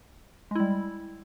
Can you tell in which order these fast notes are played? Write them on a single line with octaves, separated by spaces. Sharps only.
G#3 E4 G3